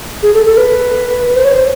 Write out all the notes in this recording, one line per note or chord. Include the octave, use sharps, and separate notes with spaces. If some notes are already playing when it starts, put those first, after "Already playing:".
G#4
A4
A4
B4
B4
C5
C#5
C5